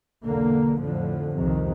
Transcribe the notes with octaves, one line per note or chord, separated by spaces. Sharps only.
B1 E2 D3 A#3
F2 A2 D3 F3
C2 F2 C3 D#3 F3